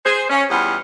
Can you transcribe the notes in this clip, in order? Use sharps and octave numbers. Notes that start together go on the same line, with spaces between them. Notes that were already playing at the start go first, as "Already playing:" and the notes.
G#4 C5
C#4
E2 G3 F4 G#4 B4 F#5